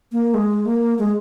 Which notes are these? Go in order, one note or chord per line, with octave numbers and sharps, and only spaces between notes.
A#3
G#3
A#3
G#3